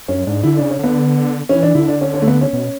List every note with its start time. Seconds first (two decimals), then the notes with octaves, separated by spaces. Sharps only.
0.08 F#2 C#4
0.27 G#2 D4
0.43 D3 E4
0.57 C#3 D4
0.71 C#4
0.79 D3 B3
1.49 E3 C#4
1.63 D4
1.75 D3 E4
1.88 D4
2.01 C#4
2.14 C#4
2.22 A3
2.27 B3
2.41 C#4
2.53 B2